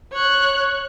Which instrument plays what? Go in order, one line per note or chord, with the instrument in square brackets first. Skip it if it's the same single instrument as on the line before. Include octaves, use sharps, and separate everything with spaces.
[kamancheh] C#5 F#6